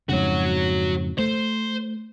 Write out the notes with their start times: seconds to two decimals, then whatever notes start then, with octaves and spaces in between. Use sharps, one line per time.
0.09 F2 G#2 C#3 F#4 C#5
1.19 A3 C5